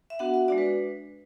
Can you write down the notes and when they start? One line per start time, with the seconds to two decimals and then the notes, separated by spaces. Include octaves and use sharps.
0.10 E5
0.19 B3 D4 F#4 F#5
0.34 E5
0.48 G#3 D4 F#4 D5
0.58 B4